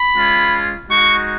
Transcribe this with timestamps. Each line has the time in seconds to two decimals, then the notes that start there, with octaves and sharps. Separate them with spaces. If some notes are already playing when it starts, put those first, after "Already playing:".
Already playing: B5
0.16 G#3 C#4 F4
0.87 G#3 D#4 F#4 C#6